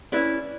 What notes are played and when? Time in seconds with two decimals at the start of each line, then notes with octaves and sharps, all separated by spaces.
0.12 C#4 E4 B4 D5